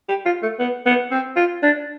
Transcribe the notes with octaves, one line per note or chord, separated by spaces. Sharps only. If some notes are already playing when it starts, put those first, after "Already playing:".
G4
F4
A3
B3
B3
C4
F4
D4